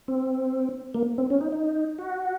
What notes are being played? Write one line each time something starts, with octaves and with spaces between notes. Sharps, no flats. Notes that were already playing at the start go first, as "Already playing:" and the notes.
C4
A#3
C4
C#4
D#4
D#4
F#4